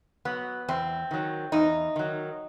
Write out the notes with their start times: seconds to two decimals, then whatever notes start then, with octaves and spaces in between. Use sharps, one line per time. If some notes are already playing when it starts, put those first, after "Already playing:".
0.25 F#3 B3
0.68 E2 C4
1.11 D#3 F#3
1.52 E2 D#4
1.96 D#3 F#3